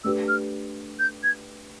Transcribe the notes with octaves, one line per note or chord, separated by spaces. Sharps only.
A3 D4 G4 B4 E6
F6
G6
G#6